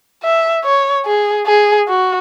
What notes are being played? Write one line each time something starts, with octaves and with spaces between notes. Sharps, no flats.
E5
C#5
G#4
G#4
F#4